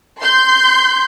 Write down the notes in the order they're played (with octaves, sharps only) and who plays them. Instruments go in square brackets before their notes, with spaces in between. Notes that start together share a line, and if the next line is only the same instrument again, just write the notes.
[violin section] C6 G6